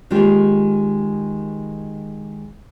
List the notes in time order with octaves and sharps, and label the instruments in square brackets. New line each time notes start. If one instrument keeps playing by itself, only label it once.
[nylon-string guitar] D#3 G#3 A#3 F4 G4